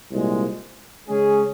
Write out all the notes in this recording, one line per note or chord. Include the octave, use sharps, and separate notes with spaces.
C2 A#2 G#3
C#3 G#3 C#4 G#4